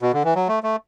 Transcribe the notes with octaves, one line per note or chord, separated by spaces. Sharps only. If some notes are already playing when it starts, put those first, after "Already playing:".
B2
D3
E3
F#3
A3
A3